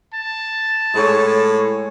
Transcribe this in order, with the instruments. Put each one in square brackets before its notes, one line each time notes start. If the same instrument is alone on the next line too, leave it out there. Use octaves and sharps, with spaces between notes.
[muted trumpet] A5
[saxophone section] A2 A4 [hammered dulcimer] G#3 C#5